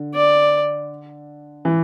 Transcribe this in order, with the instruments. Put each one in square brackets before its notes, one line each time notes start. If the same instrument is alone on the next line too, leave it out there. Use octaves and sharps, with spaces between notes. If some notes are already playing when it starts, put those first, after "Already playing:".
Already playing: [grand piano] D3
[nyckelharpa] D5
[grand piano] E3